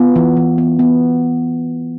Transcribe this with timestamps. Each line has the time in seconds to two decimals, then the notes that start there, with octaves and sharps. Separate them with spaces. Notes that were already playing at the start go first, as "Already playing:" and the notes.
Already playing: B3 F4
0.16 E3
0.37 E3
0.58 B3
0.79 B3